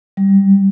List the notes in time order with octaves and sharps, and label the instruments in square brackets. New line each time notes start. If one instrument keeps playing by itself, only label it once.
[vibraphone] G3